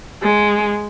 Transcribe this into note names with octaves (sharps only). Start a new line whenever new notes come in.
G#3